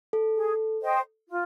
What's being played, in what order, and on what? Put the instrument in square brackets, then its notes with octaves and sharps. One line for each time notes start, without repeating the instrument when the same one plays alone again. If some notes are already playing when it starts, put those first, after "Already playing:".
[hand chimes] A4
[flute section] G#4
C5 D#5 G5
F4